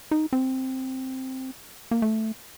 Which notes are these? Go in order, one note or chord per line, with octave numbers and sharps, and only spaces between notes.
D#4
C4
A#3
A3